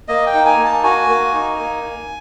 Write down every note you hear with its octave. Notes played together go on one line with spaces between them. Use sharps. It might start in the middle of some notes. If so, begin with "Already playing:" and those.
A#3 D#5
G5
D#4
G#5
A#3
A5
F#4 G#5
A#3
D#4
A#3